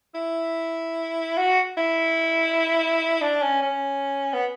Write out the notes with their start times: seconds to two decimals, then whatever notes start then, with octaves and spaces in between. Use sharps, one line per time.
0.15 E4
1.37 F#4
1.78 E4
3.21 D4
3.42 C#4
3.62 C#4
4.34 B3